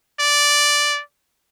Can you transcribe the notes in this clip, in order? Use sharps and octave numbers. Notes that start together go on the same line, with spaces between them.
D5